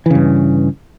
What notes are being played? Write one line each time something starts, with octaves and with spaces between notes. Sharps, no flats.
G2 C#3 E3